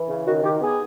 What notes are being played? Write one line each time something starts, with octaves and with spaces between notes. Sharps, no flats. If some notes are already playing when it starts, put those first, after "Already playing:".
Already playing: E3
C#3
D#3 F#4
D#3 G4
B3 G#4